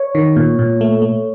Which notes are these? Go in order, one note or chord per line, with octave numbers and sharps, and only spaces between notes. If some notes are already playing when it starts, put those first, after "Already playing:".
Already playing: C#5
D#3
A#2
A#2
A3
A3